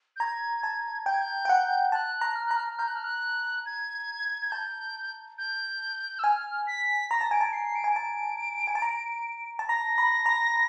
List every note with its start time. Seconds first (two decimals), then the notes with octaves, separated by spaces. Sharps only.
0.16 G6
0.20 A#5 G#6
0.63 A5
1.06 G5 G6
1.14 G#6
1.21 G6
1.45 G5
1.49 F#5
1.92 A5 F#6
2.21 A#5
2.35 F6
2.46 A#5 F#6
2.56 F6
2.79 A#5 G6
2.88 F#6
2.95 F6
3.04 F#6
3.66 G#6
4.42 G#6
4.51 A5 G6
5.38 G6
6.19 E6
6.23 G#5 F6
6.67 B6
7.10 A#5 A#6
7.21 A5
7.31 G#5 D7
7.41 A5
7.53 C7
7.75 D7
7.84 G#5
7.96 A5
8.67 G#5
8.75 A5
8.82 A#5
9.59 A5
9.69 A#5 A#6
9.98 B5
10.26 A#5